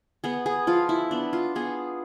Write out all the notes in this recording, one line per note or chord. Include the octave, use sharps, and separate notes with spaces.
B3 G#4
G#4
F3 F4
E4
B3 D4
F4
B3 G#4